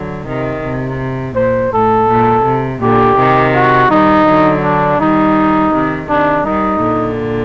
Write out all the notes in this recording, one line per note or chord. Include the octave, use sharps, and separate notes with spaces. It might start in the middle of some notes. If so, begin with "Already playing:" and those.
Already playing: D3 F#3
C3 D#3
C3
A#2 C5
A2 A4
A#2
C3
A#2 D3 G4
C3 D#3
F#4
D#3 G3 D#4
D3 F#3
D4
D#3 G3 D#4
C3 D#3
C3 D#3 D4
D#3 G3 D#4
A#2 D3